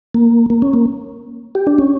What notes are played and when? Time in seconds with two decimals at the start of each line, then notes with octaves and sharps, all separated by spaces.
0.14 A#3
0.50 A#3
0.62 C#4
0.73 A#3
1.55 G4
1.67 D4
1.78 C#4